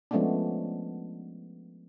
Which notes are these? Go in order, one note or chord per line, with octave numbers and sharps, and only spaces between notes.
F3 G#3 A3 B3 C#4 D4